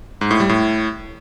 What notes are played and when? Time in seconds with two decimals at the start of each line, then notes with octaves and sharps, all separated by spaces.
0.21 G#2
0.31 A2
0.40 G3
0.49 A2